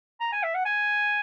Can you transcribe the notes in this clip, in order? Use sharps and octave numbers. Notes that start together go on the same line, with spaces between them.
A#5
G#5
E5
F#5
G#5